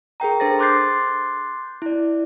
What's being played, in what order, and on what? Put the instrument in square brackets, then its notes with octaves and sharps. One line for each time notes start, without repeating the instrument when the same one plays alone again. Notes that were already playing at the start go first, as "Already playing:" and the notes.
[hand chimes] G#4 A#4 G5 A#5
D4 A4 C5 A6 A#6
C6 D6 F#6 G6 A6 C7
E4 D5